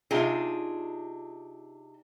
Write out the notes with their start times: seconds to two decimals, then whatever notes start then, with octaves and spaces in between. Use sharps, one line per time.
0.11 C3 D4 D#4 F4 G#4